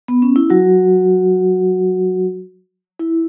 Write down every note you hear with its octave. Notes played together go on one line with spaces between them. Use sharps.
B3
C#4
E4
F#3 F#4
E4